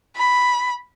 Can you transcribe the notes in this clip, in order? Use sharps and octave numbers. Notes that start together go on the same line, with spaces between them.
B5